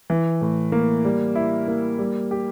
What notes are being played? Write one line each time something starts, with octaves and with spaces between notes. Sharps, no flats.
E3
A2
A#3
G3
E4
A#3
G3
G4